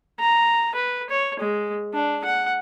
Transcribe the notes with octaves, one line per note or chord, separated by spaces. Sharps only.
A#5
B4
C#5
G#3
D4
F#5